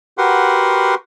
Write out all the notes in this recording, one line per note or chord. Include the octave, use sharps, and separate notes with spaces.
F#4 G4 A#4 B4 F#5 C6